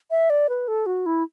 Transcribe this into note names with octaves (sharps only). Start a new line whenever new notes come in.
E5
D5
B4
A4
F#4
E4